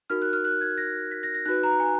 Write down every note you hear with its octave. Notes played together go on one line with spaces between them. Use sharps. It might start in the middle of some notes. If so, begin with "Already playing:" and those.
D#4 F#4 A#4 F6
F#6
F6
F#6
G#6
A#6
B6
A#6
A#6
D#4 F#4 B4 F#6
A#5
G#5